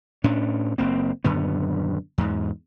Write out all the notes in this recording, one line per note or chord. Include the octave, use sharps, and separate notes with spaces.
A2 C#4 D4
F#1 A#3 C4
D#1 F#2 D3 B3
E2 G#2